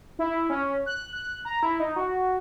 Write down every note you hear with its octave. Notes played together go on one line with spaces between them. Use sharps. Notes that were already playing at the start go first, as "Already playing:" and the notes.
E4
C#4
F#6
F#6
A#5
E4
D#4
F#4